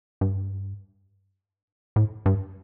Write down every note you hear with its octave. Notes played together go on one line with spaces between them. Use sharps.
G2
A2
G2